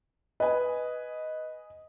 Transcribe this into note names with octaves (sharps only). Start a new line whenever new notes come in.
B4 D#5 G#5